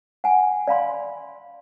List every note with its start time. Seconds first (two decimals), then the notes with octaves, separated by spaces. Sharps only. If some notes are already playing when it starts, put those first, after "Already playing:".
0.24 F#5 G#5
0.67 D5 F5 B5 C6